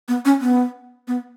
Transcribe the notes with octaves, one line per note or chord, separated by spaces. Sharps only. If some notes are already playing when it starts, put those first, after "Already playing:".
B3
C#4
B3
B3